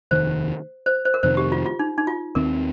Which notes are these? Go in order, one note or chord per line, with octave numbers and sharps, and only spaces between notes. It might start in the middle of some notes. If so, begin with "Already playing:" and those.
F1 D#2 D#3 C5
C5
C5
A#4
F2 C3 D#3 C5
G4
F4
F4
D#4
D#4
F4
D#2 D#3 C4 A#4